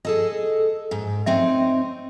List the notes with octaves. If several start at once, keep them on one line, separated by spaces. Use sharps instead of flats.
G#4 A4 D#5
G#2
C4 D#4 C#5 E5